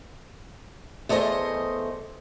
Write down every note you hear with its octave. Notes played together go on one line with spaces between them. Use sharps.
E2 A3 G#4 C5 D#5